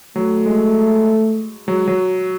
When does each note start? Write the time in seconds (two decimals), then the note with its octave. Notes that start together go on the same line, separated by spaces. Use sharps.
0.16 F#3 A3
0.46 G#3
1.67 F#3 G#3
1.87 F#3
1.98 F#3